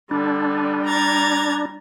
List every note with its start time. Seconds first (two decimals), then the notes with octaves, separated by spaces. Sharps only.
0.11 D3 G3 D4
0.86 A#5 G#6 A6